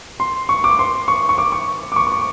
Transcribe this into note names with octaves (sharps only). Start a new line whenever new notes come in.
C6
C#6
D6
C6
C#6
C#6
D6
C#6
D6
C#6
C#6
D6